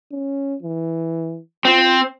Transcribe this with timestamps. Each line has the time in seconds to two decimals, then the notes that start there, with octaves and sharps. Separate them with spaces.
0.12 C#4
0.63 E3
1.65 C4 F4